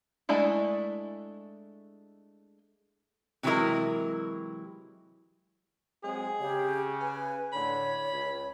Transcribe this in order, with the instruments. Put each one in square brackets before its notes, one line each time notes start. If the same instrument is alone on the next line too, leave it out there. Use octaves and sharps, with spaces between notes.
[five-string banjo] G#3 A3 D4 E4
[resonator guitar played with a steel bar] C3 E3 F#3 G#3 E4 A#4
[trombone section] F#3 G#3 C4 [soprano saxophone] G#4
[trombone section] C#3 [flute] G4
[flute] B4 [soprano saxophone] G#5
[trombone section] A2 D3 [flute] C#5 [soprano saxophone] B5
[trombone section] C#2